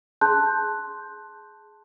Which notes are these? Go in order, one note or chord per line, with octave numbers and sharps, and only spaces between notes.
G#4 A5 C6 F#6 G6